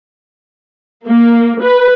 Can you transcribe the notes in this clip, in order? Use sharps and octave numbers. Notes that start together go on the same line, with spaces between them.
A#3
B4